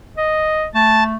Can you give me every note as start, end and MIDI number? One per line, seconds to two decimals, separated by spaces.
0.18 0.65 75
0.75 1.16 57
0.75 1.03 81